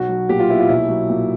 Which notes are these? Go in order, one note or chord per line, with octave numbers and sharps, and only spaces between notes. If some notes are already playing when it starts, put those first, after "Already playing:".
Already playing: B1 F#4
F#3
A#2 G4
F4
B3 E4
F4
B1 E4
F#3
A#2